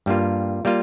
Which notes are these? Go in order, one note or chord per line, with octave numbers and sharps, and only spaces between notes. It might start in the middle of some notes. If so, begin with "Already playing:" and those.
G2 G3 A#3 F4
G3 A#3 F4